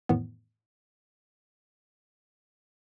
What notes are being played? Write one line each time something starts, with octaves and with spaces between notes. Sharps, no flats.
F2 A2 D#3 E3 B3